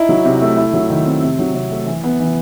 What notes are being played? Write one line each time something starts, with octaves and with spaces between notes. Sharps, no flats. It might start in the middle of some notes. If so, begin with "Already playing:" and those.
Already playing: D#4 E4
F#3
C3
A3
E4
F#3
D#3
C4
C3
F#3
C3
A3
E3
B3
E3